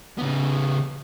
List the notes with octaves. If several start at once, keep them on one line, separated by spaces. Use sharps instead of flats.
C#3 B3